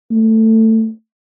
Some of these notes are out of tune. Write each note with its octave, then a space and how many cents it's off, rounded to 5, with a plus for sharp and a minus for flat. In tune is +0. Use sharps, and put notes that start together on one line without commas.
A3 +15